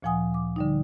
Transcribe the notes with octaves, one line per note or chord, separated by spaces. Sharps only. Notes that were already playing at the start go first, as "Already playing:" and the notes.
D2 A#2 F3 F#5 G#5 D#6
D6
D3 G3 D#4